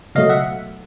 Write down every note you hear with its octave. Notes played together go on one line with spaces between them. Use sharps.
C#2 B2 F#3 A3 D#5 F5
E5 F#5